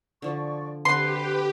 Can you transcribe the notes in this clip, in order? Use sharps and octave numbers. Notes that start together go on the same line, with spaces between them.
D3 F3 D5 C#6
D3 C4 G4 B4 C6